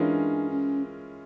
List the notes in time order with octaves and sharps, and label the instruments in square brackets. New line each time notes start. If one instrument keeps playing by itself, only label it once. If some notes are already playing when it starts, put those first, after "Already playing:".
Already playing: [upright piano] E3 G#3 C#4 F4 A#4 [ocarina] D4
[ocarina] C#4